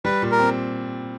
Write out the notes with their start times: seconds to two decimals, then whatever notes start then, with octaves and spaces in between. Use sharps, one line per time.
0.05 G3 B4
0.22 A#2
0.31 A#4
0.39 C4